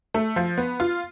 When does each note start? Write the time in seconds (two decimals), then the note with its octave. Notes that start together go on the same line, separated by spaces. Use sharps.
0.14 A3
0.36 F3
0.58 B3
0.80 F4